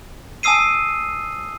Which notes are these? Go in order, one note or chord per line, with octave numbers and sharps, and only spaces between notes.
G#5 A5 D#6 E6 C7 D#7